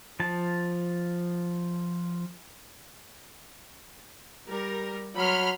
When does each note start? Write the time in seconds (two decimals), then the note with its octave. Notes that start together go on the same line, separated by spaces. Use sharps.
0.20 F3 A5
4.45 G3 A#4
5.16 F#3 B5 C6 F6